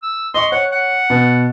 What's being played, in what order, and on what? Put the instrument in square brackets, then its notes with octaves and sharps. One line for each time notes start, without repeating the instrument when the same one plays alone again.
[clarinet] E6
[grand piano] D#5 C#6 [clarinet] C6
[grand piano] C#5 [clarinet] F#5
[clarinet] F#5
[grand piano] B2